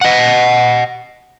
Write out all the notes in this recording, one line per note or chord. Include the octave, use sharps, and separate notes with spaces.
D#5 F#5